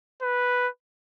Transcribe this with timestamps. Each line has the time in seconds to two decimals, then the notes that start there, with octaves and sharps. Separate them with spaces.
0.22 B4